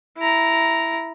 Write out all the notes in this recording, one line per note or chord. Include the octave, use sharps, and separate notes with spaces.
E4 A#5